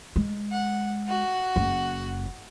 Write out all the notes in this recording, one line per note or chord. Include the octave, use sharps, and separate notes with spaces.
G#3
F#5
F#4 F#5
F#1